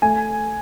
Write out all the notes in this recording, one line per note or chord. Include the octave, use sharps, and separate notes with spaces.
A3 G#5